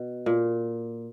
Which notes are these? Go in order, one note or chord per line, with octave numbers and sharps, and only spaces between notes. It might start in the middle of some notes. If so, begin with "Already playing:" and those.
Already playing: B2
A#2